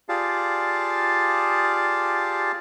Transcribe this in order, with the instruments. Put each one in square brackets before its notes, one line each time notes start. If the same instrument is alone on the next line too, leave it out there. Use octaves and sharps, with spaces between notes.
[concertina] F4 G4 G#4 D5 F5 A5